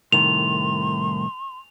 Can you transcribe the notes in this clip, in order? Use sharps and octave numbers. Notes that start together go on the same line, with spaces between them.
C2 A2 D#3 C6 F7